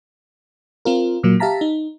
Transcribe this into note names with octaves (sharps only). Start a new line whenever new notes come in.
C4 F4 A#4
A#2 F#3 A#3
G4 E5 F5 A5 A#5 B6
D#4